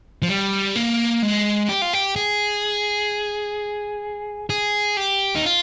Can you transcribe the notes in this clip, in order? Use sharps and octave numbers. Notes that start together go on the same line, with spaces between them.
F3
G3
A#3
G#3
G4
F4
G4
G#4
G#4
G4
D#4
F4